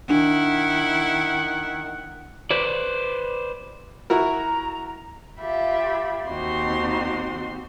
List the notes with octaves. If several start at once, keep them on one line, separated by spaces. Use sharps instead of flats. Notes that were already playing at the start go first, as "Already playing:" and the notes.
D#3 D4 E4 F#5
B4 C5 D5
E4 F#4 A#4 A#5
F4 G4 E5 B5
D#2 C4 D#4 F#4 G4 C6